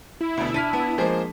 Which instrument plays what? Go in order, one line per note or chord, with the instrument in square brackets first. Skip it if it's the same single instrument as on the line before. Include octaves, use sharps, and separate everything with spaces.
[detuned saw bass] E4
[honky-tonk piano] D2 B2
[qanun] D4 [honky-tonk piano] F6 B6 D#7
[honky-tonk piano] B3 [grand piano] A5
[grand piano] F3 G#3 G#4 [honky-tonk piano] A#3 C5